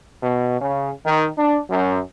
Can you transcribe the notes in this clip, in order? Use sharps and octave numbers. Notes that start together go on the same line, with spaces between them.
B2
C#3
D#3
D4
F#2